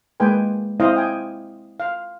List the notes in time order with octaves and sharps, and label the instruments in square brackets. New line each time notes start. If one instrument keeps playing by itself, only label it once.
[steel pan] G#3 A#3 B4 G5 G#5
C4 E4 C5 D#5 F5
G5 G#5
F5